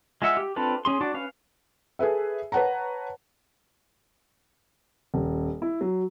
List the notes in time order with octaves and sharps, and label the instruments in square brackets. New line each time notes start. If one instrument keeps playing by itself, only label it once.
[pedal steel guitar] G#3 F4 E5 F#5 E6
G4
C4 D4 F4 A4 B4
C#4 G#4 C6
D4 F#4 D5
C#4 B4 F5
[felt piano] G#4 A4 B4 E5
B4 C#5 F#5 A5 A#5
[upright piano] D#1
E4
F#3